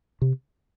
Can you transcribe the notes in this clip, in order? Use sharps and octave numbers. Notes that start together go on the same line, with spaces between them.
C3